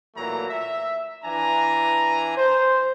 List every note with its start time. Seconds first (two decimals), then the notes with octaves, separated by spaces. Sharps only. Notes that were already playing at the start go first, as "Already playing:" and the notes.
0.16 A#2 E3 F#3 A3 A#5
0.49 E5
1.24 E3 D4 G#5 A#5
2.37 C5